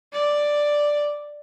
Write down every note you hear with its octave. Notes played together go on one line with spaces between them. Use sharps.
D5